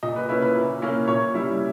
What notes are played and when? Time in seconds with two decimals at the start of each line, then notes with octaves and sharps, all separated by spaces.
0.03 A#2 D#5
0.16 B4
0.29 A#3 C#4 E4 B4
0.42 B4
0.55 A#2
0.82 A#3 C#4 E4
1.08 A#2 C#5
1.34 G3 C#4 E4